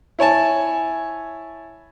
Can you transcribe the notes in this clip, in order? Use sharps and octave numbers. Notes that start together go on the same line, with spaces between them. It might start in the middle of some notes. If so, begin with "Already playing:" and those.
E4 C#5 G#5 A5